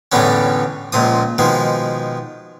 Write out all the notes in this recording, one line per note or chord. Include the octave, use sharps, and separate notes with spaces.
E2 A2 D3 G3 B3 C#4
C#2 A#2 F3 D#6
B2 D#3 F3 G#3